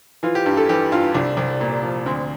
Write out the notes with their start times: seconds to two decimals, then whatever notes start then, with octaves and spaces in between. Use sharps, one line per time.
0.23 E3 F4
0.35 G4
0.46 G2
0.57 A4
0.69 E3 G4
0.92 G2 F4
1.14 C2 D4
1.37 C2
1.61 A#2
1.83 F3
2.06 D2 C4